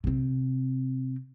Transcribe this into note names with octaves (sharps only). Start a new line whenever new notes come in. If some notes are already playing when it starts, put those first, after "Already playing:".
C3 C4